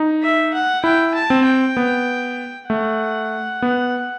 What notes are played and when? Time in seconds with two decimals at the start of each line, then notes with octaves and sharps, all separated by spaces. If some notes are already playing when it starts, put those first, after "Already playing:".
Already playing: D#4
0.22 E5
0.53 F#5
0.84 E4 G5
1.14 A5
1.30 C4
1.45 G5
1.77 B3
2.69 A3 F#5
3.62 B3